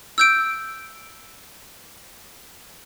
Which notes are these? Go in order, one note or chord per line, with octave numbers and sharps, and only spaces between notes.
E6 G6 D7